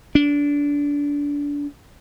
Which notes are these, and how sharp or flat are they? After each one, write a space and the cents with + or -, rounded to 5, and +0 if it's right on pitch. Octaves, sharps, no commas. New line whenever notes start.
D4 -25